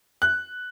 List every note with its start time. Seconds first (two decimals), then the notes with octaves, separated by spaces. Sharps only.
0.22 F#6